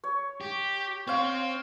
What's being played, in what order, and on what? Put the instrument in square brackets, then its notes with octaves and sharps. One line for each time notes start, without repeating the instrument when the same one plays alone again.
[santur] C#5
[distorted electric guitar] G4
[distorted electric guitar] C4 C5 [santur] C#5 F5